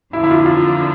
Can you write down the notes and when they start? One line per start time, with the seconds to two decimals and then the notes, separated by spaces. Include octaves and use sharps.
0.13 F2 D3 F3 A#3 D4 E4
0.24 E4
0.31 F4
0.46 F4